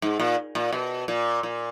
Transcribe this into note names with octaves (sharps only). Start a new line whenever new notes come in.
G#2
A#2
A#2
B2
A#2
A#2